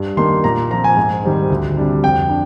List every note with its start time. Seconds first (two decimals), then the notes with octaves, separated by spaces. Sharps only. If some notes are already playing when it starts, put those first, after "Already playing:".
Already playing: G2
0.17 D#3 A#3 D4 C6
0.44 A#2 A#5
0.71 F3 C4 A#5
0.84 G#5
0.97 G#2
1.24 D#3 G3 C4
1.50 D2
1.77 C3 G3 D4
2.04 F2 G5
2.29 D4